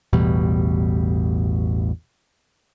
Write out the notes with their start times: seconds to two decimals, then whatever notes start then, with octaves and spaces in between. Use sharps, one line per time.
0.13 A1 E2 B2 G3